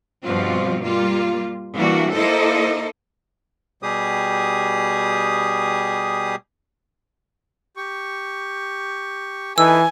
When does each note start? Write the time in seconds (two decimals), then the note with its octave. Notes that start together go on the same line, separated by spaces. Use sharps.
0.24 G2 B2 F3 C4 F4
0.83 G3 A#3 F4
1.76 E3 G3 A#3 D4 F#4
2.13 A#3 D#4 E4 A4 C5 D#5
3.83 B2 G3 G4 G#4 D#6
7.77 G4 C#6
9.58 E3 D#4 A4 B4 G#5 E6